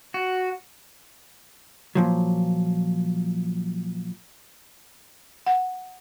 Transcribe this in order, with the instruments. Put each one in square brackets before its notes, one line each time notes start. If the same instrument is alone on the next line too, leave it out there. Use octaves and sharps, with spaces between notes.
[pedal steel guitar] F#4
[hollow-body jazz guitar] A#2 F3 F#3
[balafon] F#5